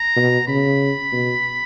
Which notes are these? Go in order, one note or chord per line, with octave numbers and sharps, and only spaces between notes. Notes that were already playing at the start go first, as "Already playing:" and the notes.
Already playing: A#5
B2
C#3 B5
B2